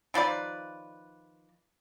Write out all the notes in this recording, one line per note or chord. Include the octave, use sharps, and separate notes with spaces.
D#3 F3 B4 D5